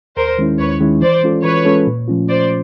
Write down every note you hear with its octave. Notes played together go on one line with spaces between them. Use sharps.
D#2 A#4 C5
D#3 G#3 C#4 E4
D#2 B4 C#5
D#3 G#3 C#4 E4
E3 C5 D5
G#3 C#4 F4 A4
E3 B4 C#5
G#3 C#4 F4 A4
A#2
F3 A3 C#4 F4
A#2 C5 D5